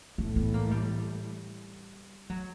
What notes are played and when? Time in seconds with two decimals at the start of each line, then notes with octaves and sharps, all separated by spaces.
0.18 A2 E3 A3 B3
0.36 B3
0.54 A#3
0.71 G3
2.30 F#3